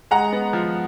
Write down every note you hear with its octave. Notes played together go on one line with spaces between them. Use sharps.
G#3 F#5 A#5
B3
F3